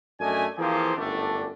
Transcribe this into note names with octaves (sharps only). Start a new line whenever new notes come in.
F#2 A3 D4 D#5 G#5
E3 F3 A#3 C4 G4 G#4
G1 F#2 A2 A3 D4